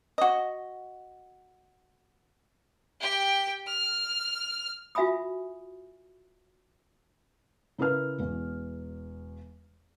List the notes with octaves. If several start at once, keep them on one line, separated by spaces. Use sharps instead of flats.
F#4 D#5
G4 G5
F6
F4 F#4 E5 G#5 B5 D#6
C#3 E4 A#4 B4 F6
E1 E2